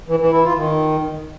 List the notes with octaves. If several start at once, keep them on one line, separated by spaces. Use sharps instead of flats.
E3
E3
E4
F4
D#3